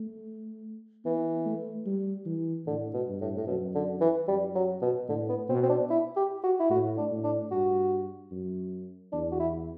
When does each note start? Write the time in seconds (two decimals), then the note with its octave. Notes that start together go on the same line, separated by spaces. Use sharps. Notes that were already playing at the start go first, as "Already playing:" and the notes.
Already playing: A3
1.05 E3 B3
1.46 A3
1.86 G3
2.26 E3
2.66 A2 D3
2.94 B2
3.08 G2
3.21 A2
3.37 A2
3.47 F#2 B2
3.75 D3
4.01 E3
4.28 F#2 G3
4.55 F#3
4.82 B2
5.08 A2 D3
5.29 B3
5.49 B2 C4
5.63 C4
5.70 D4
5.90 E4
6.16 G4
6.44 F#4
6.60 E4
6.70 A2 F#4
6.97 D4
7.11 A2
7.24 D4
7.51 G2 F#4
8.31 F#2
9.12 E2 D4
9.32 F#4
9.39 E4